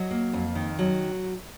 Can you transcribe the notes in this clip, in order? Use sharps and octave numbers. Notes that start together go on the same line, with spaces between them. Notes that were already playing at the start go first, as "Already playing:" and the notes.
Already playing: F#3 D#5
A#3
F2
D#3
F#3